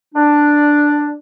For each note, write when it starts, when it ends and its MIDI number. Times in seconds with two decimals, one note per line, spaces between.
0.15 1.14 62